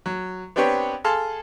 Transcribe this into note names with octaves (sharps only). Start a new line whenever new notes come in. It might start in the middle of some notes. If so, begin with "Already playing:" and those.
F#3
B3 C4 D4 G4 B4 C#5
G#4 A4 F5 A5 C6